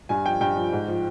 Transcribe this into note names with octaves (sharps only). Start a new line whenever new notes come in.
G2 G#5
F3 G5
G2 G5
F3
G#2
F3